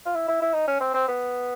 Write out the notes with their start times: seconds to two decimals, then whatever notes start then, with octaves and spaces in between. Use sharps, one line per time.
0.06 F4
0.15 E4
0.28 E4
0.41 E4
0.54 D#4
0.67 C#4
0.80 C4
0.94 C4
1.08 B3